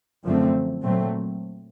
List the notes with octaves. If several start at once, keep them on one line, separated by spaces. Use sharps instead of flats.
F#2 D3 F3 A3 C4
A#2 F#3 A3 C4